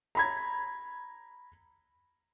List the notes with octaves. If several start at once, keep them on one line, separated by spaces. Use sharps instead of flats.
A#5 B5 G#6